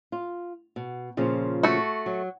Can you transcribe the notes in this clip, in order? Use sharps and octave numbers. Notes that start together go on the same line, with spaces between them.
F4
B2
A#2 C#3 F3
A3 F#4
F#3